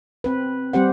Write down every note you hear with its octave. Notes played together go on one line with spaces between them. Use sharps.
C4 B4
G3 C4 G4 C5 F#5